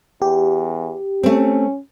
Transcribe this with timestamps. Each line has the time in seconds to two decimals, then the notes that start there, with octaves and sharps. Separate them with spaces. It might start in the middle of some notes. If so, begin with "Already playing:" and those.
0.22 E2 G4
1.23 A3 C4 C#4